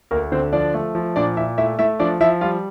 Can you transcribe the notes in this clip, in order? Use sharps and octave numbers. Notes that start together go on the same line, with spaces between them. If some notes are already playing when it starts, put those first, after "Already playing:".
D2 A#3 A#4
D3 C4 C5
F3 D4 D5
A3
F3
A#2 D4 D5
A#2 E4 E5
A3 E4 E5
A3 E4 E5
F3 D4 D5
F3 E4 E5
G3 F4 F5